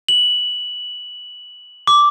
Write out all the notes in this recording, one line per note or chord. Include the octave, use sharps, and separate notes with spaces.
F#7
D6